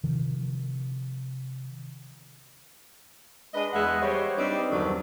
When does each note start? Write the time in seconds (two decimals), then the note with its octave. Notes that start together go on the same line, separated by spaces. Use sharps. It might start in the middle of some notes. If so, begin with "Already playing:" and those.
0.04 C3 D#3 F3
3.54 G#3 D4 B4 D#5
3.73 E2 G#3 B4 E5 F#5
4.02 G3 C5 C#5
4.37 G3 C4 D4 D#4 B4 D5
4.71 E2 G2 D3 D#3 F3 F#3